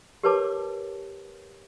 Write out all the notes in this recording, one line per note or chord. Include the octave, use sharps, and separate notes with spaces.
G4 A#4 B4 C#5 A5 D6